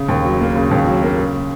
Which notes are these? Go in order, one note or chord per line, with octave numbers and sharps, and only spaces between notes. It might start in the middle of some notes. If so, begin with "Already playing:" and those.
Already playing: C#3
D#2
F#3
A#3
C#3
D#2
F#3
A#3
C#3